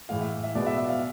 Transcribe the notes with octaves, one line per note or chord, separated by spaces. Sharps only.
A2 E3 G#3 F5
E5
E5
B2 G#3 B3 D5
E5
E5
F5